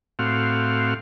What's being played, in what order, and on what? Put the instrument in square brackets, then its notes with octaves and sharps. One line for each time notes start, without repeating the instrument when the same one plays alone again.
[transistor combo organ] A2 C4 F#4 F5